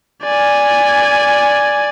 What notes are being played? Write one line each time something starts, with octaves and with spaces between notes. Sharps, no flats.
D5 G#5